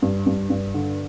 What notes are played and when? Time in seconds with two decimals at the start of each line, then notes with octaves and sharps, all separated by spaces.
0.02 G2
0.26 G2
0.50 G2
0.74 D3